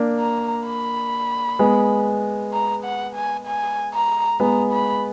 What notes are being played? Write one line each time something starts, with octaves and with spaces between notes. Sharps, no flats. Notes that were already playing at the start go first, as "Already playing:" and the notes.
Already playing: A#3 D4
A#5
B5
G#3 B3
A#5
F#5
G#5
G#5
A#5
G#3 B3 A#5
B5